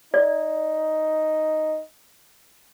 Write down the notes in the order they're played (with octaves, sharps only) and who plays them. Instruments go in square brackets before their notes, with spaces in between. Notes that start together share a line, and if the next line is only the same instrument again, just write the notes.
[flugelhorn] D#4 [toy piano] D5